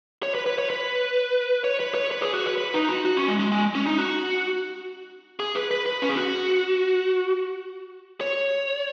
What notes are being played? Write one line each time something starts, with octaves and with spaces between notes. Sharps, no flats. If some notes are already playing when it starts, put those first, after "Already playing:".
C#5
B4
B4
C#5
B4
C#5
B4
C#5
B4
G#4
F#4
B4
B4
D#4
F#4
F#4
C#4
G#3
G#3
G#3
C#4
D#4
F#4
G#4
B4
B4
B4
C#4
G#4
F#4
C#5